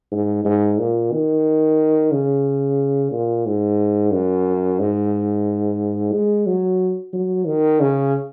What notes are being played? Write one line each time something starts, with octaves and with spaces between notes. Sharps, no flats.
G#2
G#2
A#2
D#3
C#3
A#2
G#2
F#2
G#2
G#3
F#3
F#3
D#3
C#3